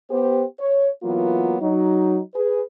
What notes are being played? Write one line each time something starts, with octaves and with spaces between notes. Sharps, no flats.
B3 G4 C5
C#5
E3 F#3 A#3 B3 F4
F#3 D#4
G#4 B4